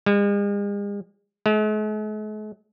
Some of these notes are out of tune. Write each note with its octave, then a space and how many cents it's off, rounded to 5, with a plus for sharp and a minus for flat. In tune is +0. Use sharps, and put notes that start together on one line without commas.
G#3 -45
G#3 +45